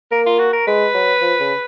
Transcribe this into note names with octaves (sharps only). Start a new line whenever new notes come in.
A#3 A#4
F4
F#4
A#4
G#3 B4
F#3
F3
C#3